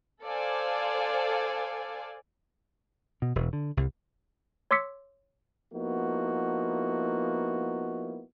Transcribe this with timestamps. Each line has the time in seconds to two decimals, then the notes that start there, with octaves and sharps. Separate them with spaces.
0.23 A4 C5 D5 F5 G#5
3.22 B2
3.35 E1
3.53 D3
3.77 C2
4.71 C#5 C6 D6 E6 B6 C#7
5.72 F3 A#3 B3 D#4 E4 F#4